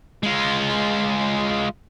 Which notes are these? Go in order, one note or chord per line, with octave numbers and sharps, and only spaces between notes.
G#3 F4